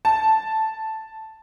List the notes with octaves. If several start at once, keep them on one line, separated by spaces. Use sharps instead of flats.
A5